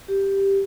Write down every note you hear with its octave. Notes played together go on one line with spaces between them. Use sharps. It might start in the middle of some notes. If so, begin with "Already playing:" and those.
G4